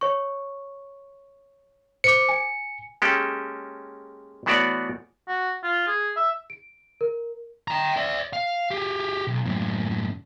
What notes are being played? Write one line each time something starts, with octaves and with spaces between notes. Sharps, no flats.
C#5 C#6
C5 D6 C#7
G#5
G#3 A#3 C#4 G4 A4
E3 A3 B3 F#4 C#5 D5
F#4
F4
G#4
E5
D7
A#4
G5 A#5
D5 E5
F5
G4 G#4
B1
F#2 A2